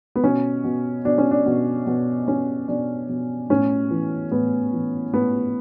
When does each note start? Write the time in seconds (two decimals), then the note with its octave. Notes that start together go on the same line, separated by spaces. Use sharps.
0.16 B3
0.23 B2 C#4
0.64 B2
1.05 B2 D4
1.18 C#4
1.31 D4
1.46 B2
1.87 B2
2.28 B2 C#4
2.68 B2 D4
3.09 B2
3.50 A2 C#4
3.90 E3
4.31 A2 B3
4.73 E3
5.14 A2 B3